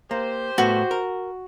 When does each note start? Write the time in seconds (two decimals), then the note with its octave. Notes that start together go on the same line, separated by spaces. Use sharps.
0.11 A#3 G4 C5
0.58 A2 A3 B3 F#4
0.91 A#4